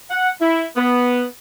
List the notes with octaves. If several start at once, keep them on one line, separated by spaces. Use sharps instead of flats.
F#5
E4
B3